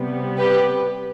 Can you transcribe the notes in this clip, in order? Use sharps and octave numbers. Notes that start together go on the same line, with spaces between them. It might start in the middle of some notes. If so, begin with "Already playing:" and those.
Already playing: C3 G3 B3
G4 B4